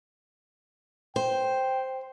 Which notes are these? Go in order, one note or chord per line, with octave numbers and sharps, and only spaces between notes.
C5 G5